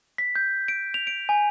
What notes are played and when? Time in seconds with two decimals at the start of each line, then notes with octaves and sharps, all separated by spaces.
0.18 B6
0.35 G6
0.68 D7
0.94 F7
1.07 D7
1.29 G#5